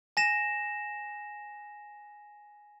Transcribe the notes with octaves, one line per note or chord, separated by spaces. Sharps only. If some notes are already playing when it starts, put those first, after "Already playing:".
G#5 A#6 E7